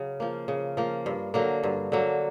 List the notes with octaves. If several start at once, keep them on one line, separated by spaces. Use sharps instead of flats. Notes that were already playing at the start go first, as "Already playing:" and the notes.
Already playing: C#3 F#3
F3 A#3
C#3
F3 A#3
G2
D3 F#3 A#3
G2
D3 F#3 A#3